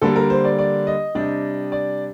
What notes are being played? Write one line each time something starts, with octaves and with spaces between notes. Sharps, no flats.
D3 G3 A#3 A4
A#4
C5
D5
D5
D#5
C3 G3 D4
D5